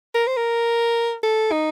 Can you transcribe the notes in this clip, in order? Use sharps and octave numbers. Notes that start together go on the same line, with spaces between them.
A#4
C5
A#4
A4
D#4